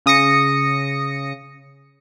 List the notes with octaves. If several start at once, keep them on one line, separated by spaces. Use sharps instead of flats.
C#3 D#6 A#6 C#7